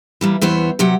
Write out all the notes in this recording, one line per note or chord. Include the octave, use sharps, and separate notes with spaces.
E3 G3 A#3
E2 E3 B3 C5 C#5
C3 F#3 G4 F#5